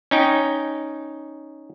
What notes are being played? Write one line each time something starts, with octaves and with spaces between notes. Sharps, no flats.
C#4 D#4 G5